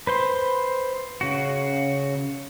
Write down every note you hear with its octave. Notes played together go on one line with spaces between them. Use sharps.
B4 C5 C6
C#3 F#4